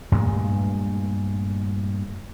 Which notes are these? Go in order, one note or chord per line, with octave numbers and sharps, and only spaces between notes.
G2 A#2 G#3 A3